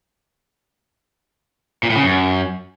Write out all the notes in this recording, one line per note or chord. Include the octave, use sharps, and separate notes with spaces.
A#2
A2
C#3
F#2